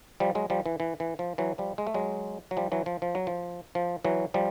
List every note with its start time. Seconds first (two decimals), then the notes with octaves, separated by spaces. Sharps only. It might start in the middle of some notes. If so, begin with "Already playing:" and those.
0.20 F3 G3
0.35 F#3 G#3
0.50 F3 G3
0.66 E3
0.80 E3
1.00 E3
1.19 F3
1.38 E3 F#3
1.58 F3 G3
1.78 G#3
1.87 A3
1.94 F#3 G#3
2.51 F#3
2.57 F3 G3
2.72 E3 F#3
2.86 F3
3.02 F3
3.15 F#3
3.27 F3
3.75 F3
4.05 E3 F#3
4.34 F3 G3